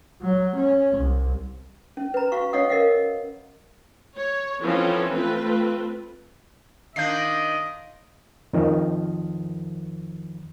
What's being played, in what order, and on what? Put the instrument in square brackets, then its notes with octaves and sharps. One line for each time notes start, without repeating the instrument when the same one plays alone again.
[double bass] F#3
C#4
C2
[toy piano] C#4
B4 A#5
F#4 F5 C#6
C#4 C#5 D#5 F5 F#5 D#6
A#4 D#5 F5 F#5
[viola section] C#5
E3 F3 C4 C#4 A4
A3 C4 F4 B4
[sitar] D#3 D4 [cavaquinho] D#4 F4 [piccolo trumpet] D#5 [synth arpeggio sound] G6 C7
[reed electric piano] F2 D#3 F3